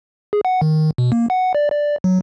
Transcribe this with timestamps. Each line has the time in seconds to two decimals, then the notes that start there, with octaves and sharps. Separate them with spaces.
0.33 G#4
0.45 F#5
0.62 D#3
0.98 B2
1.12 A#3
1.30 F#5
1.55 D5
1.72 D5
2.04 F#3